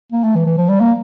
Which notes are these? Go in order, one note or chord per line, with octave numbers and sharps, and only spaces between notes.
A#3
A3
E3
E3
F3
G3
A#3